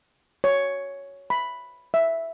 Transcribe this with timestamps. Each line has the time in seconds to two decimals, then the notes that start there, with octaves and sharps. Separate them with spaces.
0.44 C#5
1.30 B5
1.94 E5